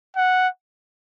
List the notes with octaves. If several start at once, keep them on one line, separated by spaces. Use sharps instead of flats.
F#5